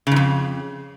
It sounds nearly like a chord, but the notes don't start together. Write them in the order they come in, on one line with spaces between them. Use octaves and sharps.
C#3 G#2 F2